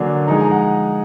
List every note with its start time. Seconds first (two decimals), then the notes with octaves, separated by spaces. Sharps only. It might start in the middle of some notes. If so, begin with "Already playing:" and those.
Already playing: D3 F#3 A#3 D4 G#5
0.27 F3 G#3 D#4 A#5
0.36 G#5
0.44 A#5
0.51 F#5